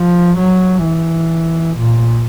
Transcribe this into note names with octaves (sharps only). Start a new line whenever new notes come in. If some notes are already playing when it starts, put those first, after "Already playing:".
Already playing: F3
F#3
E3
A#2